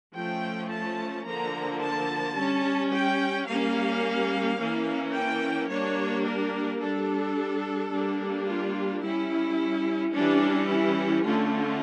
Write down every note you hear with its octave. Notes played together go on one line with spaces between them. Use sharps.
F3 A3 C#4 G5
A5
D3 F3 A#3 A#5
A5
G3 C#4
G5
G3 A#3 C#4 F5
E3 A#3 C#4
G5
G3 A#3 D4 C#5
A#4
G3 D4 A4
G3 A#3 D4
F4
G3 C#4 E4
E3 G3 C#4 D4
E4
D3 A3 C#4 F4